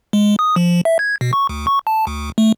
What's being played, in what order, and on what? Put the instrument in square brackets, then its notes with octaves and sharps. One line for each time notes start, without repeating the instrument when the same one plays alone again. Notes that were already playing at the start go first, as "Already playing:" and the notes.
[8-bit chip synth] G#3
D#6
F3
E5
G#6
B2
C#6
D2
C#6
A5
D2
A3